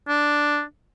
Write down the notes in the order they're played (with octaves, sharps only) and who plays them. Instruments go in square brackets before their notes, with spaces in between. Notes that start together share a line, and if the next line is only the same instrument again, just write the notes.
[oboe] D4